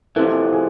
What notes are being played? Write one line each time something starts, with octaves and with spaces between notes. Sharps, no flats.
F2 C3 E3 A4
G#4